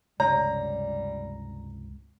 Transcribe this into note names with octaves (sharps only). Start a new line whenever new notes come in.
C#2 G2 C3 G3 C#5 A#5